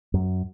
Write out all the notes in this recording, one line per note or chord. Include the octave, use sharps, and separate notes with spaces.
F#2